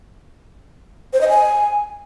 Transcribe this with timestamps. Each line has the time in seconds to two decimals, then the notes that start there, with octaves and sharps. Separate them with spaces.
1.13 C5
1.21 D#5
1.29 G#5